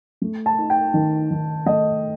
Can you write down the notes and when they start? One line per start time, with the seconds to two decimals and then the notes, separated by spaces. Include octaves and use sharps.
0.22 A3
0.46 A5
0.58 D#4
0.70 G5
0.94 D#3
1.30 D#3
1.66 A3 D#5